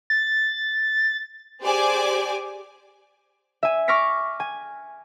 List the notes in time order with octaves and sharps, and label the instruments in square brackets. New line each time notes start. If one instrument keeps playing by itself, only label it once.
[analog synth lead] A6
[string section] G4 G#4 C5 D5 G#5 D6
[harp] E5 G#5
C#6 D6 F6 A#6 B6 C#7
G#5